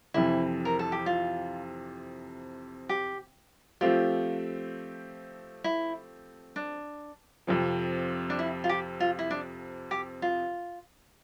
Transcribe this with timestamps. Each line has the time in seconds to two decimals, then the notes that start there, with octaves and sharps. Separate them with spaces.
0.14 F2 C3 E3 E4
0.65 A#4
0.79 A4
0.92 G4
1.06 F4
2.89 G4
3.81 F3 A3 C4 F4 G4
5.64 E4
6.56 D4
7.47 F2 C3 F3
8.30 D4
8.39 E4
8.64 F4
8.69 G4
9.00 F4
9.19 E4
9.31 D4
9.91 G4
10.22 F4